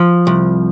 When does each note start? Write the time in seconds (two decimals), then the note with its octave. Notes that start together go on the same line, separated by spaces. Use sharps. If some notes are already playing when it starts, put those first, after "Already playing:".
Already playing: F3
0.27 C2